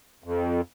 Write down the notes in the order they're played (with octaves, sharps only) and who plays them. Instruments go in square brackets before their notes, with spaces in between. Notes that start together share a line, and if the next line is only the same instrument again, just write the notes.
[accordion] F2